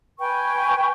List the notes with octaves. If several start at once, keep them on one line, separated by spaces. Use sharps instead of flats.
B4 G5 G#5 C#6